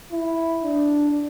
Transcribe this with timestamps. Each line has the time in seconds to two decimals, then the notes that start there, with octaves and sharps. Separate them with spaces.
0.12 E4
0.63 D4